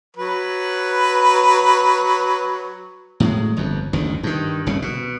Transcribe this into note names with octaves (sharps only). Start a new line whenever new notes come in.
F#3 B4
A2 F#3 G#3
G1 F2
F#1 D2 D#3
G2 D#3
F#1 C2 C#3
B2